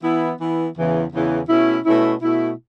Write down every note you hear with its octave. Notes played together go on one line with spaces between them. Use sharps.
E3 B3 E4
E3 B3 E4
E2 C#3 E3
E2 C#3 E3
B2 A3 C#4 E4
B2 A3 C#4 E4
B2 A3 E4